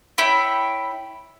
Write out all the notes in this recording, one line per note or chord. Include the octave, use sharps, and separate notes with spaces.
E4 C#5 G5 B5